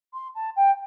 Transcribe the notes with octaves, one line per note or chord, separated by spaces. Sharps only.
C6
A5
G5